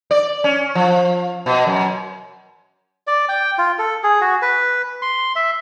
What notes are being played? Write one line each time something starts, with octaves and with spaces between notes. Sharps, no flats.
D5
C#4
F3
B2
F#2
D5
G5
F4
A4
G#4
F#4
B4
C6
E5